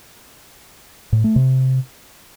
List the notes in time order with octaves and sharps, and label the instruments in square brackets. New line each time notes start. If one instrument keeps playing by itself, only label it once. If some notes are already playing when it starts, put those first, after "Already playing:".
[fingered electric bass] A2
A3
C3